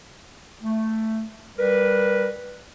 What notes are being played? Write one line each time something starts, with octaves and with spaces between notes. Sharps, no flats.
A3
G3 A#4 B4